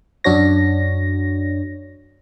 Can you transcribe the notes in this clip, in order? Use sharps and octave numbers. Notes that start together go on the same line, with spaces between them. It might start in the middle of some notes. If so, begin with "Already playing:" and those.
F#2 D4 F#4 C#5 A#6